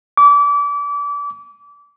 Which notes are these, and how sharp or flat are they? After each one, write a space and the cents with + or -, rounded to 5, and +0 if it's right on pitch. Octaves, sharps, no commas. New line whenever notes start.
D6 -30